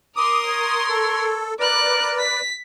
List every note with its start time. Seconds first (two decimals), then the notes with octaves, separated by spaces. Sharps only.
0.16 A#4 C6 D6 D#6
0.47 C#5
0.89 A4
1.60 A#4 B4 D5 D6 F#6
2.19 B6